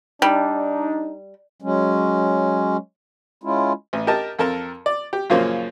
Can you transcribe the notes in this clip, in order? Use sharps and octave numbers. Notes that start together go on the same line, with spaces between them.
G3 D4 D#4
F#3 G#3 C#4
G#3 C#4 E4 F4
A1
G4 A#4 D#5 A5
F2 A4 A#4 A5
D5
G4
F#2 A#2 C#3 F3 A#3 C#4